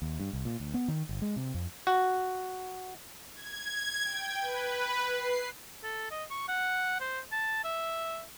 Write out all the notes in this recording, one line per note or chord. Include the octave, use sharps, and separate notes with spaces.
D#2
G2
C2
A#2
D2
B3
D#3
G1
G#3
C3
F2
F#4
G#6
G5
B4
C7
A4
D#5
C#6
F#5
C5
A5
E5